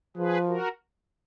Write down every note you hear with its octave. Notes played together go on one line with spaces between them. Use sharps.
F3 G#4 B4
F#4 A#4